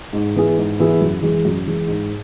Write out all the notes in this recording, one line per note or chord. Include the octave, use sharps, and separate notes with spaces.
G#2
E3 B3 E4 G#4
G#2
E3 B3 E4 G#4
F#2
E3 G#3
F#2
E3 G#3
G#2